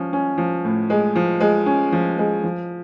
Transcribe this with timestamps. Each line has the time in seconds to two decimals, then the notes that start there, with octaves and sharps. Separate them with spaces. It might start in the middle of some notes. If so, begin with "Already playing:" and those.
Already playing: F3 C#4
0.13 C#4
0.38 F3
0.65 A2
0.90 G#3
1.16 F3
1.40 G#3
1.66 C#4
1.92 F3
2.18 G#3
2.44 F3